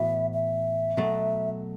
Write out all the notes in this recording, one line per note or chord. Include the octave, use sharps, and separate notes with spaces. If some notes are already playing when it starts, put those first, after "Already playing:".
Already playing: A2 E3 B3 F#4 E5
E5
B2 F#3 A3